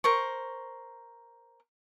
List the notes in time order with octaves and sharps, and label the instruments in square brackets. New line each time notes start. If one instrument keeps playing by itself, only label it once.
[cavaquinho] A#4 C5 C#6